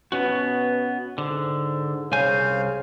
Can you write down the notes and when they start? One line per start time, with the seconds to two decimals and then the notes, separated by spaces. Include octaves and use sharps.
0.12 B2 B3 C#4 F#4
1.18 G#2 D3
2.12 C2 C#3 C5 F5 G#5